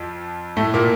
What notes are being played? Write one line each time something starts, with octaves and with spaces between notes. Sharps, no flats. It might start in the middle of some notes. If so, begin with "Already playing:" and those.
Already playing: F2 F3
A2 A3
A#2 A#3